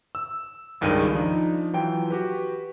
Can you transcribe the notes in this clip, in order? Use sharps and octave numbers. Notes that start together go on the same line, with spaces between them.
E6
G#1 C#2 G2 D#3 G#4 D#7
F3 D4 D#4
E3 F#3 F4 G5
F#4 G4 B4